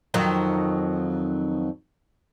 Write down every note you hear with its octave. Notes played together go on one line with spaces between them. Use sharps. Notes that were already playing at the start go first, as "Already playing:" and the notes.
F2 D#3 F#3